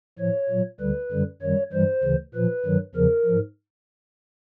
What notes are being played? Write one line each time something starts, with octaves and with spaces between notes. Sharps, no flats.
A2 F3 C#5
A#2 F#3
D2 D3 G3 B4
F#2 D3 G3
F#2 D#3 G3 C#5
G2 E3 G3 C5
D2 C#3 E3
A#2 F3 B4
G2 D#3 F#3
E2 C#3 F3 A#4
G#2 F3